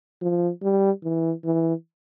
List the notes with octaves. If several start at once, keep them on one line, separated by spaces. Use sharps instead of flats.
F3
G3
E3
E3